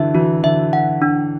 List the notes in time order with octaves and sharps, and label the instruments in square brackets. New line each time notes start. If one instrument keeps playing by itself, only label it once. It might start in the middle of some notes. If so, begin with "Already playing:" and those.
Already playing: [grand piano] D3 E3 F#3 [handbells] E5
[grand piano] E3 [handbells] F#4
[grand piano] D3 [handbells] E5
[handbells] F#5
D4